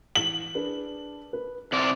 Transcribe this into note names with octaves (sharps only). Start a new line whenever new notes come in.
E3 F#7
D4 G#4 B4
B4
C3 D5 C6 A6